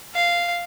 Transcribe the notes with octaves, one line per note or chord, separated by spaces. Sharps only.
F5